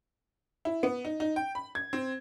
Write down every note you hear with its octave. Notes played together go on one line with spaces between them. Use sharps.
E4
B3
D#4
D#4
G5
B5
G#6
C4